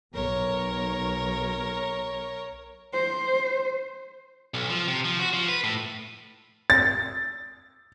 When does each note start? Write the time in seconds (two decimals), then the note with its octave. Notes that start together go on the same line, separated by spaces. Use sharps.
0.14 B1 A#4 C#5
2.93 C5
4.54 B1
4.70 F3
4.88 C3
5.05 F3
5.19 F#4
5.33 F3
5.49 B4
5.64 A2
6.70 A6